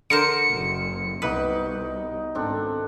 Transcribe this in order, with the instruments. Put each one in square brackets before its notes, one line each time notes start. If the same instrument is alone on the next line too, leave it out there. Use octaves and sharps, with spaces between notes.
[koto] D3 A#4 C5 [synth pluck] C#7
[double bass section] F#1
[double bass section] C2 [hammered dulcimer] B2 D#4 D6 [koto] B4
[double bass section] G#1 [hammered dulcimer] C4 D4 A4